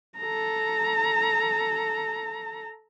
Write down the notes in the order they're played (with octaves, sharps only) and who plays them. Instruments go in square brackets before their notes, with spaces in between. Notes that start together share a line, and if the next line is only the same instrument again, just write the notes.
[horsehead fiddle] A4 A#5